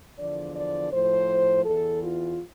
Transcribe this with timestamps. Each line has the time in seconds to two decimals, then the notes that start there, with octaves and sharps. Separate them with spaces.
0.18 E2 D3 F3 D5
0.55 D5
0.92 A2 F3 C5
1.65 E2 E3 A4
2.02 F4